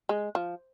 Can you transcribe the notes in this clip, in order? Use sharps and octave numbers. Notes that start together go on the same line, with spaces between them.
G#3
F3